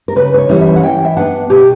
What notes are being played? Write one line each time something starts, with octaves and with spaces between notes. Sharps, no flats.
A#4
C#3 B4
B4
C#5
E3 G3 C#4 E4
E5
F#5
E3 G5
E5
B3 D4 F#5
B2 G4